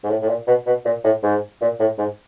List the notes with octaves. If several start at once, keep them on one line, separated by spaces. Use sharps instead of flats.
G#2
A2
A2
A#2
B2
B2
A#2
A2
G#2
A#2
A2
G#2